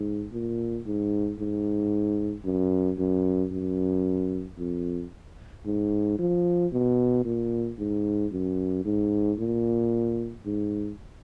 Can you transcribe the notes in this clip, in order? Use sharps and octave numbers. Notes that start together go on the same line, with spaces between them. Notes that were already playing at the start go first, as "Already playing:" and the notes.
Already playing: G#2
A#2
G#2
G#2
F#2
F#2
F#2
F2
G#2
F3
B2
A#2
G#2
F#2
G#2
A#2
G#2